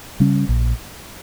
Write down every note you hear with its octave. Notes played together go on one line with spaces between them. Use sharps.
C#3 G3 C#4
A#1